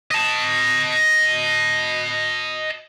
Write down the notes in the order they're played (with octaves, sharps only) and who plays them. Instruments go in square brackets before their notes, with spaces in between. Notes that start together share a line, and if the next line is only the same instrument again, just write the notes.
[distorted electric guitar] D#5 A5